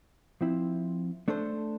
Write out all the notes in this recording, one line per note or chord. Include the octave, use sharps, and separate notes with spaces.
F3 C4 E4
A3 D4 A4 C5